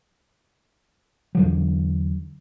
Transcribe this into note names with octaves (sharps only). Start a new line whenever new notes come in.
E2 D3 F#3